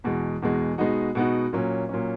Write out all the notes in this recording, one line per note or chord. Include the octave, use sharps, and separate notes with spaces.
E2 B2 G#3
E2 B2 G#3
B2 G#3 B3 D#4 F#4
B2 G#3 B3 D#4 F#4
A#2 F#3 C#4
A#2 F#3 C#4